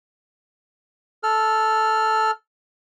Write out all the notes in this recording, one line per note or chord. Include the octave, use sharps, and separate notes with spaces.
A4 F6